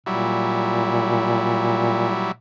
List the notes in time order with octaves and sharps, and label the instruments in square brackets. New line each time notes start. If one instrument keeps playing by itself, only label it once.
[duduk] A#2 [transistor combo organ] F#3 G3 E4